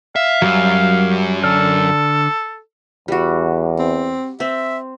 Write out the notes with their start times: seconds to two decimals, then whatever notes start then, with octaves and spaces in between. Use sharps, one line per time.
0.16 E5 F5
0.42 F#2 F#3 G3 E5
1.44 D3 A4 D5 F6
3.08 E2 G3 F#4
3.79 C4
4.40 C4 E5